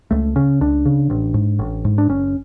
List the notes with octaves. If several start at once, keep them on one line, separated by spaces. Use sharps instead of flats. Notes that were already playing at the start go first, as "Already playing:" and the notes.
C#2 A3
C#3 C#4
C#2 D4
C#3
A1
G#2
A1
G#2
D4
F#1 C#4